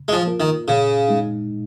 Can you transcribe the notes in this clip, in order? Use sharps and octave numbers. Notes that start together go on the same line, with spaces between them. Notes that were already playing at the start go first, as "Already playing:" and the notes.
Already playing: C#3
G#3
F3
A#3 F4 A#4
D#3
A#2 C#3
G#3 D#4